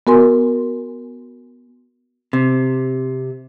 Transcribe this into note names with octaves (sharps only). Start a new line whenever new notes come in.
B3 F#4 A#4 G#5 C6
C3